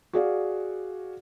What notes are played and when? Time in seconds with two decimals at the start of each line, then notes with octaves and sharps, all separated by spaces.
0.13 F#4 G#4 D5 F5